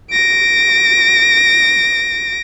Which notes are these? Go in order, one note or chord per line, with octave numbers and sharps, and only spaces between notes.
A#6 D7